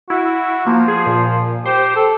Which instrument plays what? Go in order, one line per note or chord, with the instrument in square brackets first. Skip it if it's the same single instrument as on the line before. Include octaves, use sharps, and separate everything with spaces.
[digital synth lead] E4 [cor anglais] F#4
[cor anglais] F3 [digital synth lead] A#3
[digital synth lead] G#4
A#2
[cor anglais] G4 [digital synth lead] C5
[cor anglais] A4